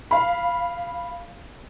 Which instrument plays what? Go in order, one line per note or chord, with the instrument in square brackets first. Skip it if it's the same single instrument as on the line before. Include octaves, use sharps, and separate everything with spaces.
[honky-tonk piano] F5 B5